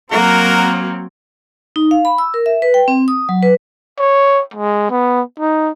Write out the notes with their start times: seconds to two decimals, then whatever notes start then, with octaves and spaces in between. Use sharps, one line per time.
0.12 F#3 A#3 C4 F#4 A#4
1.76 D#4
1.91 F5
2.05 B5
2.18 E6
2.34 A#4
2.46 E5
2.62 B4
2.74 G5
2.88 C4
3.08 D#6
3.29 F#3
3.43 B4
3.99 C#5
4.54 G#3
4.91 B3
5.40 D#4